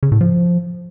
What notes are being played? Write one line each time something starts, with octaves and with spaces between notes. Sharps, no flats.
C#3
A2
F3